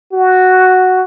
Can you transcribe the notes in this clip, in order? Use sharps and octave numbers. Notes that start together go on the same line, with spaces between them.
F#4